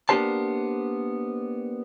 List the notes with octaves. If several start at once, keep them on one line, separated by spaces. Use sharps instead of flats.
A#3 B3 D4 G4 C5 A5